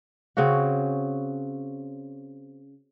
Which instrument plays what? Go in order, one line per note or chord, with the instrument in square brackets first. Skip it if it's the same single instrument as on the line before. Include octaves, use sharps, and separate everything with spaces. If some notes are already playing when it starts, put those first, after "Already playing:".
[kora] C#3 C4 C#4 F#4